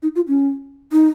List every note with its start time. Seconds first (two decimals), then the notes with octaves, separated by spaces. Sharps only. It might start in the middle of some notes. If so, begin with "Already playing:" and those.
0.03 D#4
0.16 F4
0.28 C#4
0.92 D#4